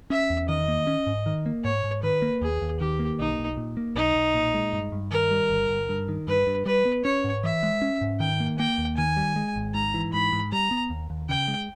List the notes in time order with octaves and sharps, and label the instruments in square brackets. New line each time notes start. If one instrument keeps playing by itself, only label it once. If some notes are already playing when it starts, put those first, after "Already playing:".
[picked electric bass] C#4 [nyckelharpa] E5
[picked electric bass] E2
[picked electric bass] D#3 [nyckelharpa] D#5
[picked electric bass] A#3
C#4
G#2
D#3
A#3
[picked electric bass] G#2 [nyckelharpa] C#5
[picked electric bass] G#2
[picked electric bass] D#3 [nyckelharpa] B4
[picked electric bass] A#3
[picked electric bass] D#2 [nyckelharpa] G#4
[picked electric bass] D#2
[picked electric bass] D#3 [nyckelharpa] G4
[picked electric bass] A#3
[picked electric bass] B1 [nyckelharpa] D#4
[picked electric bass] B1
A#2
A#3
[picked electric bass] B1 [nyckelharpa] D#4
[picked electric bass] B1
A#2
G#3
G2
G2
[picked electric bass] D#3 [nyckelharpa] A#4
[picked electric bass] G3
G1
G1
G2
D#3
[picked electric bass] G2 [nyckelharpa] B4
[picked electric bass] G2
[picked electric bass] G3 [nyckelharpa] B4
[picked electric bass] B3
[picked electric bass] C#4 [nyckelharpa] C#5
[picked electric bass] G#2
[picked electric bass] E3 [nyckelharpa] E5
[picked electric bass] G#3
C#4
G#2
[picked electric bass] D#3 [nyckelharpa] G5
[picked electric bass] A#3
[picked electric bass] A#3 [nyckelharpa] G5
[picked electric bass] D#2
[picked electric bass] D#3 [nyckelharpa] G#5
[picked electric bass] G3
G#3
G#1
[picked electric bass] G#2 [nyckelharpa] A#5
[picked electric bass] E3
[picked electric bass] G#2 [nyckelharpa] B5
[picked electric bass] G#2
[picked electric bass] G3 [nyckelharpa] A#5
[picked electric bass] B3
D#2
D#2
[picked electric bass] C#3 [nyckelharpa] G5
[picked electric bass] G#3